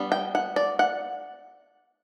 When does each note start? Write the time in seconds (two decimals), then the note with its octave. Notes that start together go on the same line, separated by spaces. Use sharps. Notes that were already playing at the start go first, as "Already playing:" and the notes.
Already playing: G3 B3 D4
0.12 G5
0.35 F#5
0.56 D5
0.79 F#5